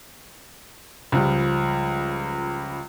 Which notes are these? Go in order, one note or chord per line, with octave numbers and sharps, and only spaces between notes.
C#2 F3 G3